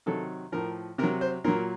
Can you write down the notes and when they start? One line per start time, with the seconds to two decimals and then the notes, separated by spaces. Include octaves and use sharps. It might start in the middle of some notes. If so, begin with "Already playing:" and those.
0.06 C3 D#3 F#3 A4
0.52 A2 F3 A#4
0.98 C3 A#4
1.03 F#3
1.21 C5
1.44 A#2 F#3 A#4